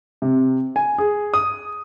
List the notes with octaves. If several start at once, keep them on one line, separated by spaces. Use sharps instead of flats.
C3
G#5
G#4
D#6